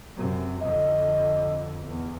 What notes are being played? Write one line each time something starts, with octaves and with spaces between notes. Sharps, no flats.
F#2 C3
F2 D3 D#5
E2